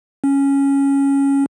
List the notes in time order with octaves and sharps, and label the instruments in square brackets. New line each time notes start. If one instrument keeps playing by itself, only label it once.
[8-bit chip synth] C#4